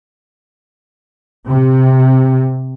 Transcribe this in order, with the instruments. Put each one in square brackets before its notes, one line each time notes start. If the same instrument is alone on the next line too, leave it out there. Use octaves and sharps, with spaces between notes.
[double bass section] C3